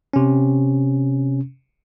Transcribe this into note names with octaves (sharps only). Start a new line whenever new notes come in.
C3 C#4